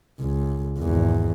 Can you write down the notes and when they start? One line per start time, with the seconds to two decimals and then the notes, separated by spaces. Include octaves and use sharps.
0.20 C#2
0.79 G#1 E2